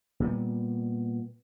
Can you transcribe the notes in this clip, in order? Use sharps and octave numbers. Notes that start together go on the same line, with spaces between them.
A#2 G3 A#3 B3